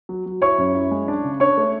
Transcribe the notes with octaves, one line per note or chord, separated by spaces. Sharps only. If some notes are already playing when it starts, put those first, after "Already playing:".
F#3
F#3
E4 C#5 C#6
F#2
E4
G#3
D4
C#3
D4 C#5 C#6
A3